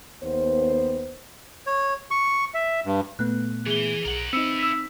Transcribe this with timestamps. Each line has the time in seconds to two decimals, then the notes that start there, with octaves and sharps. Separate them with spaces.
0.23 D#2 B3 C5
1.66 C#5
2.11 C#6
2.54 E5
2.85 G2
3.19 A#2 A3 B3 F#6
3.66 E3 G#4 G7
4.05 B1 A#4 F#5
4.33 B3 C4 D#4 E4 E6
4.59 E6 B6